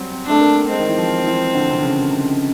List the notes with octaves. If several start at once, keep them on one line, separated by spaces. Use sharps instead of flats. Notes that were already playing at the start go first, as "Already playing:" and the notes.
Already playing: F#3 G3 C4
C4
A3 D4
A#3
G#3 C4
D#3
E3
F3
E3
D3
C3
C#3
C3